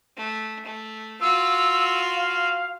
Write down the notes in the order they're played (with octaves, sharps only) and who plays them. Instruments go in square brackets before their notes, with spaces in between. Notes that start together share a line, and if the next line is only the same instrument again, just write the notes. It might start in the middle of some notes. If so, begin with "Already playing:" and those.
[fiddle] A3
A3
[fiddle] F4 F#4 [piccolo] E6
[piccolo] F5